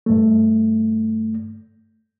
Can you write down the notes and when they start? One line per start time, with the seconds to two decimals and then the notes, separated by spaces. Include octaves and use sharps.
0.06 G2 A3